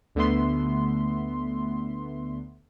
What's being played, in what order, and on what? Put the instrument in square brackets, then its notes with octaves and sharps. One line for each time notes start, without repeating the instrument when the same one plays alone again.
[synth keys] D2 D3 A3 B3 E5 C6